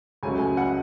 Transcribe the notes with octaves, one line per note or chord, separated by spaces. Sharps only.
C#2 C#3 F#3 A3 G#5
G#5
F#5